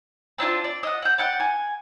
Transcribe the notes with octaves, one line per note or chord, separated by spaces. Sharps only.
C4 D4 E4 F4
D5
D#5 F#5
F#5 G6
D5 F#5 G5
G#5